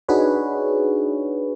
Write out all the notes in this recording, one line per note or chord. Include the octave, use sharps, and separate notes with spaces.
D4 D#4 F#4 G#4 B4 C#5